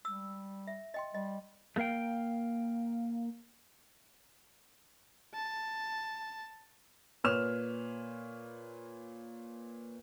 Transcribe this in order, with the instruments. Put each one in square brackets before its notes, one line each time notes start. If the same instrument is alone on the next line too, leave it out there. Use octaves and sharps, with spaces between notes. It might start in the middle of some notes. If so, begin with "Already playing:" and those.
[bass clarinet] G3 [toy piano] E6
[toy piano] E5
D#5 G5 C6
[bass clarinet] G3 [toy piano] D#5
[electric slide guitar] A3 A#3 A#4 F5 G5
[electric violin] A5
[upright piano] A#2 B4 C#5 F6 E7